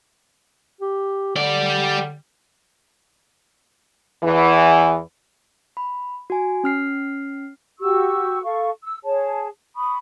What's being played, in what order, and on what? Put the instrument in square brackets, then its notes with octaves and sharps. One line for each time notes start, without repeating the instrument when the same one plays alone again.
[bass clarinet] G4
[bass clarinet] D3 [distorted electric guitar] G3 D5
[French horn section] E2 E3
[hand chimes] B5
F#4 G#5
C#4 F6 C7
[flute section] F#4 G4 C#6 E6
A4 F5 C#6
E6
G#4 C#5 A5
B5 C#6 D#6